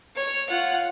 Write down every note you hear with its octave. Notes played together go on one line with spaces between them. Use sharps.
C#5
F4 F#5